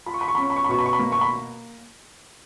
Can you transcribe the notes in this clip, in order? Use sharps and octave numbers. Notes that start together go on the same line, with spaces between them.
F4 B5
C#6
B5
C#6
B5
C#4
C#6
B5
C#6
B5
B2 C#6
B5
C#6
B5
A#3
C#6
B5